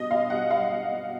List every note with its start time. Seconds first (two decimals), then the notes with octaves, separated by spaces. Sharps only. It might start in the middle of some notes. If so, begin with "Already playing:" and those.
Already playing: B2 G3 D#5
0.10 B2 F5
0.30 G3 F#5
0.50 G3 F5
0.71 B2
0.91 B2